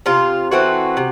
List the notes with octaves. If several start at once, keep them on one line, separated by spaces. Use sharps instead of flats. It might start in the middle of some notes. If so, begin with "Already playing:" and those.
C3 F4
E3 A3 C4 F#4
C3